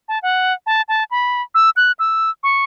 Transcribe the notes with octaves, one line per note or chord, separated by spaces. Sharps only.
A5
F#5
A5
A5
B5
E6
F#6
E6
C#6